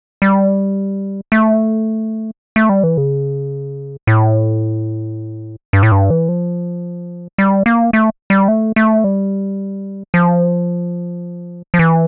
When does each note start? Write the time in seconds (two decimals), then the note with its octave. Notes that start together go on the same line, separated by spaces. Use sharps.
0.22 G3
1.32 A3
2.56 A3
2.69 G3
2.83 E3
2.97 C#3
4.07 A2
5.73 G2
5.83 A2
5.92 G2
6.10 E3
6.29 F3
7.38 G3
7.66 A#3
7.93 A3
8.30 G3
8.48 A3
8.76 A3
9.04 G3
10.14 F3
11.74 F3
11.79 E3